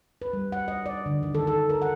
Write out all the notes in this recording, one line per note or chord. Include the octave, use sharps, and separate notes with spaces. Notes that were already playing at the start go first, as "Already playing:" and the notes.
B4
G3
F#5
D#5
D5
D3
D#3
A4
A4
A#4
F#5